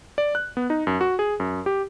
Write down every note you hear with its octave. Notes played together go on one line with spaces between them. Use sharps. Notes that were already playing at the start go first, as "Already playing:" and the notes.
D5
F#6
B3
D#4
F#2
F#4
G#4
F#2
G4